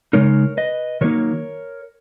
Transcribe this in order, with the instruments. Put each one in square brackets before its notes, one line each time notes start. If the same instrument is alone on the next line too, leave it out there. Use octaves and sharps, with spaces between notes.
[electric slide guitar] C#3 G#3 D#4 A#4 C#5
B4 D#5
D#3 F#3 A#3 D#4 A#4 C#5